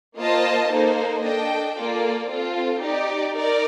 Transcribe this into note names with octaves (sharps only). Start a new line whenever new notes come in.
A#3 F4 C5 D#5 A5
A#3 D#4 A4 C5
D4 A4 D#5 G5
A#3 F4 A4 D5
C4 F4 A4
D#4 G4 D5
D#4 A#4 D5